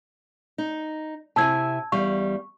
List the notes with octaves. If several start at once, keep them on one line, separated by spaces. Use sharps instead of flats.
D#4
C3 E4 G#5 A5 E6 G#6
E2 G3 F5 C#6